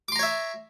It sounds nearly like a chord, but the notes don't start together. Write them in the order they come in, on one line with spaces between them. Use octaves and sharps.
D6 C6 A#5 C#5 E5